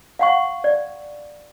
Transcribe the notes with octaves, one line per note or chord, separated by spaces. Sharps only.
F5 F#5 C#6
D5